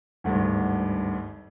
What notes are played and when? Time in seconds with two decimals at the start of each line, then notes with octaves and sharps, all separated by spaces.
0.24 G#1 D2 G2